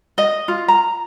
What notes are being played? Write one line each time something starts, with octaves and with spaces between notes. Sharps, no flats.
D#5
F4
A#5